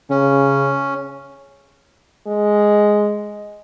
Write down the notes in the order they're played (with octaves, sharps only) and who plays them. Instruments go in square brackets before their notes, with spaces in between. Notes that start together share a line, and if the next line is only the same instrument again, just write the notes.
[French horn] C#3 [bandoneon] C#4
[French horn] G#3